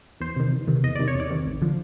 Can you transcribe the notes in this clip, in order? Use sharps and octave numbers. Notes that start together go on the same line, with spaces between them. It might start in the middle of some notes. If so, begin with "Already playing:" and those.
E2 C5
C3 D#3
E2
C3 D#3
E2 D#5
C3 D#3 D5
C#5
E2
D5
C3 D#3
A1
D3 F3